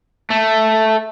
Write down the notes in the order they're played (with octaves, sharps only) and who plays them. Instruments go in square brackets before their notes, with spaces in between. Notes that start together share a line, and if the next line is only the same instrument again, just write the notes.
[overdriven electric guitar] A3